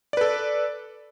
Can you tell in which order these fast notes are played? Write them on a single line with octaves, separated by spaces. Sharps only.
D5 B4 A4